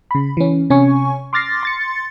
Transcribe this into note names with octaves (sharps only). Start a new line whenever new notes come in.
C#3 B5
E3 C#4
C3 C#4 G#5 C#6
C6 D6 F6 A6 A#6 C7
C6 A6 C#7